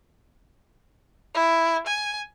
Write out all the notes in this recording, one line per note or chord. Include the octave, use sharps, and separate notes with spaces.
E4
G#5